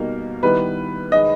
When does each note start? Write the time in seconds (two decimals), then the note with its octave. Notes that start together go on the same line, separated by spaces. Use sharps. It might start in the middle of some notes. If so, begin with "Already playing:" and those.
Already playing: B2 G3 A#3 D#4 A#4
0.43 D#3 G3 B3 E4 B4
1.12 D#3 G#3 D#4 D#5